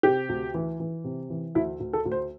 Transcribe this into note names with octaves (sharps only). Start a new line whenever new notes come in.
C3 G4
D2
E3
E3
C3
E3
D2 E4
D2
A4
D2
C5